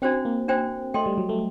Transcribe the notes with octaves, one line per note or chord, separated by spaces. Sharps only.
C4 D4 F#4 C5 G5
A#3
D4 F#4 C5 G5
A3 A4 D#5 G5 C6
G3
F#3
A3